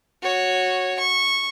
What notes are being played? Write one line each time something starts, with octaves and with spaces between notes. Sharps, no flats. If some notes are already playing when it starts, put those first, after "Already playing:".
F#4 C#5
C#6